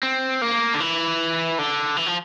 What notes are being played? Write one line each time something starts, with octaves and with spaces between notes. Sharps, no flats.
C4
A#3
D3
E3
D3
E3
F3